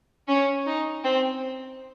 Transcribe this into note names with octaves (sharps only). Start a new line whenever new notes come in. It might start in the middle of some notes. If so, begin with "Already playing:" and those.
C#4
D#4
C4